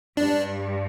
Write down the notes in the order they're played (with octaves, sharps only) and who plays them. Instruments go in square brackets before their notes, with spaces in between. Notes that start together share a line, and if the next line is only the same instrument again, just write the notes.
[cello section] G2 [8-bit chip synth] D4